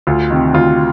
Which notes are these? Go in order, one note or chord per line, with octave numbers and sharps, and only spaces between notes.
D2 F4
C3 D#3
D2 F4